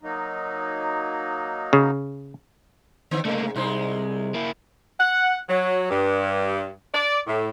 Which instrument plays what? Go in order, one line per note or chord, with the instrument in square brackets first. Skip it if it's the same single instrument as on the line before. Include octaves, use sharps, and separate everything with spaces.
[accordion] F#3 A#3 D#4
[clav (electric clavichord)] C#3
[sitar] D3 B3 C4
[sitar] G#2 C3 [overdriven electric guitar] A3 A#3
[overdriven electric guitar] C2 [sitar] G#3 D#4 C5
[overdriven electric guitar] A#3 E4
[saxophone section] F#5
F#3
G2
D5
A2